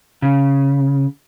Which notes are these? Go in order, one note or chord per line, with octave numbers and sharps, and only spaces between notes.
C#3